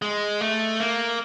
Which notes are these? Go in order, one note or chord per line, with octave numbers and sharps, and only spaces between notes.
G#3
A3
A#3